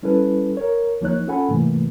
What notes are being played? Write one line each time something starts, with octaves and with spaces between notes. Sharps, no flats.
G3 C#4 E4 A4 B4
A#4 C#5
D2 F3 A#3 D#4 C#5 F#6
C#4 F4 A4 F#5 G#5 B5
G#2 C3 E3 A3 A#3